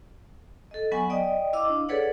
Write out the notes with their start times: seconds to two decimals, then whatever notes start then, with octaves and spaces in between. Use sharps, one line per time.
0.71 A4 D#5
0.92 F#3 B3 F#5 G#5 C#6
1.10 D5 D#5 G5 D#6
1.53 E4 D#5 F5 D6 E6
1.68 D4
1.89 G#4 A4 B4 C#5 D5 F#5